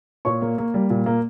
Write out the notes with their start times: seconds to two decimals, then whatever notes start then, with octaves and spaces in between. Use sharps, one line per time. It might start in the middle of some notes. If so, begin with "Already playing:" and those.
0.25 A#2 C#5 C#6
0.42 A#3
0.58 A#3
0.74 G3
0.90 A#2
1.06 A#3